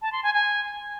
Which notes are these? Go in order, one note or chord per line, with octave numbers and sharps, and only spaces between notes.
A5
C6
G#5
G#5